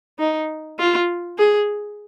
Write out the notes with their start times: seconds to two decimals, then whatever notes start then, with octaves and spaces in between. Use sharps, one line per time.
0.19 D#4
0.79 F4
1.39 G#4